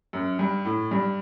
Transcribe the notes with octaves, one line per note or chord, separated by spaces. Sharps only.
F#2
G2
A2
G2